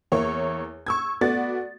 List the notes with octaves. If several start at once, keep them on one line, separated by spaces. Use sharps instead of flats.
E2 A#3 E4 C#5 C#6
C#6 E6 G#6
A3 B3 F#4 D5 A6